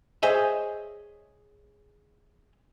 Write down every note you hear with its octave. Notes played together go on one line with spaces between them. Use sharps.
G#4 C5 C#5 D#5 E5 G#5